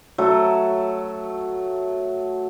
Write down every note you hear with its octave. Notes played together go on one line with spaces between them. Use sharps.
F#3 A3